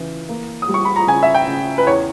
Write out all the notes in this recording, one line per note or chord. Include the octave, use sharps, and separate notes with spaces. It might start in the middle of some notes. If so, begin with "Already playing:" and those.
Already playing: C#3 E3
A#3
D#6
G3
C#6
B5
A#5
C#3 G#5
E5
G5
C#3
B4
E2 C#5